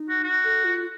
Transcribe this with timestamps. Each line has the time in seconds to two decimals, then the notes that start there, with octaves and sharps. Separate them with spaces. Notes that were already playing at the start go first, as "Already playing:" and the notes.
Already playing: D#4
0.09 F#4
0.24 F#4
0.44 A4
0.64 F4